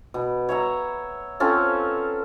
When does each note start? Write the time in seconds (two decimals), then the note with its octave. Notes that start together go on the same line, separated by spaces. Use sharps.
0.14 B2
0.49 C#5 E5 A#5
1.40 C4 C#4 F4 A4